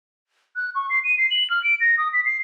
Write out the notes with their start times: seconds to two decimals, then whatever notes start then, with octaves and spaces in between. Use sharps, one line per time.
0.56 F#6
0.75 C#6
0.90 C7
1.04 D#7
1.18 C7
1.31 F#7
1.50 F6
1.64 D7
1.80 A#6
1.98 D#6
2.13 B6
2.25 C7